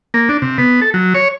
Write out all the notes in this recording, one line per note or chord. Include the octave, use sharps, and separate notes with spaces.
A#3
D4
C3
B3
A4
F#3
C#5